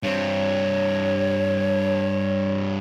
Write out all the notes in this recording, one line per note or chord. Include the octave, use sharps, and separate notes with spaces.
G2 C4 C#5